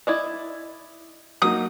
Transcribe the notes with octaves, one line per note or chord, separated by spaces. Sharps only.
E4 D5 D#5
F#3 A#3 D#4 D#6